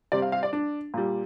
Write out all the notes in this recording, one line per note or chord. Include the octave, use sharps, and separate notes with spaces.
C3 G3 D5
F5
F5
D5
D4
A#2 G3